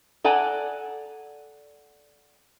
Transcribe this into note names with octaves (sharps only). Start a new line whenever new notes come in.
A4 D5 F#5 G#5 A#5